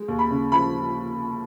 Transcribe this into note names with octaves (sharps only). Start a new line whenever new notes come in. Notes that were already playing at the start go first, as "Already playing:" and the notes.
Already playing: G#3
D#2
B5
C#3
F3 B5